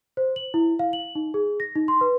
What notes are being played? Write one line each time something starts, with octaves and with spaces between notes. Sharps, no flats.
C5
F#7
E4
F5
F#7
D#4
G#4
A#6
D#4
C6
B4